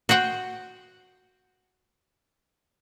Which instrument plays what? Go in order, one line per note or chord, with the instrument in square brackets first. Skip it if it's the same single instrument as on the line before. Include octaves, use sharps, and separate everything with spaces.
[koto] F#4 C5 F#5 G5